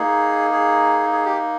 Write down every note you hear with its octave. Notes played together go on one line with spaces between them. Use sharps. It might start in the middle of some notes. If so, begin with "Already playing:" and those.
Already playing: A#3 D#4 G#4
G#4
G#4
G4